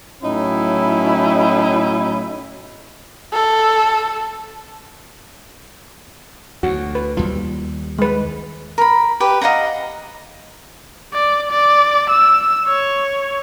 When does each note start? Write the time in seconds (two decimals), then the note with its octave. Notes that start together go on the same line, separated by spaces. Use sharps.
0.23 A2 F#3 C#4 D#4 E4 B5
3.33 A4
6.63 D2 F#4
6.95 B4
7.17 D#2 G3 F4
7.98 G#3 B4
8.78 A#4 B5
9.20 G4 B4
9.41 D#5 F5 F#5 A#5
11.14 D5
11.52 D5
12.10 E6
12.68 C#5